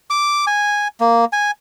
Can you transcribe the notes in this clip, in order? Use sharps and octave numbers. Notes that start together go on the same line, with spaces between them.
D6
G#5
A#3
G#5